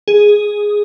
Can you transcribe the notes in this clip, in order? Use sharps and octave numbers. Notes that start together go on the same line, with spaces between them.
G#4